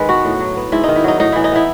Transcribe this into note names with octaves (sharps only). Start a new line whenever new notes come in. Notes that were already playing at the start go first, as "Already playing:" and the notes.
Already playing: D#3 G#3 B4
B3 F#4
A2
F#3
B3
G#2 E4
D#3 D#4
E4
F#3 D#4
A2 D#4
E3 E4
D#4
B3 E4